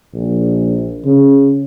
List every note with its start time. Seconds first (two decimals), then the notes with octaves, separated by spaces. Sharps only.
0.14 A#1
1.05 C#3